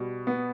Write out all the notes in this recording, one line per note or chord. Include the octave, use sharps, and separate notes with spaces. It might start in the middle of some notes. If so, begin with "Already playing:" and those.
Already playing: B2 G3
B3